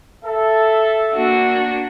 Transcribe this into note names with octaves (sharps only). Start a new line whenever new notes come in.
A4 E5
A#3 D4 F#4